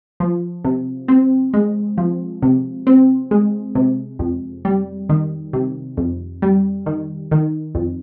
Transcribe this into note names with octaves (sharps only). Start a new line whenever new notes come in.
F3
C3
C4
G#3
F3
C3
C4
G#3
C3
F2
G3
D#3
C3
F2
G3
D#3
D#3
F2